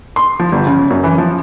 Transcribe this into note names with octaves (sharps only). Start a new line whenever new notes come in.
C6
F3
G1
C#3
F#2
E3
F3